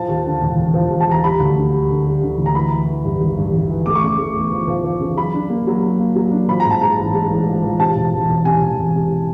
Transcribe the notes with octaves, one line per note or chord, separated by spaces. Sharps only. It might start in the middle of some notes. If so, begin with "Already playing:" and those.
Already playing: F3 A5
D#2
D3
E1
E1
F3
D#2
A5
D#2 A#5
G3 B5
D2
D3
G3
D3
G3
D3
D2
A#5
E3 B5
E3
E3
G2
G#1
G2
G#1
E3
A3 D6
C#6
C#3 D6
A3
E2
F3
F3
F3
C#3
F#3 B5
D4
A#3
F#3
F#3
A#3
F#3
D4
F3 B5
A#5
G#2
A5
G#2 A#5
A1
G#3
A1
F3
F3
C3 A5
E1
E1
E1
C3 G#5
E1
E1
C3